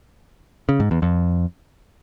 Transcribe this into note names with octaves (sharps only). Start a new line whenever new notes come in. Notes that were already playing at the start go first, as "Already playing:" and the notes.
C#3
G#2
E2
F2